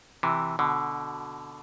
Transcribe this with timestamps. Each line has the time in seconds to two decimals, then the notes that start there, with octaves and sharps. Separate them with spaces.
0.23 C3 E3
0.59 B2 D3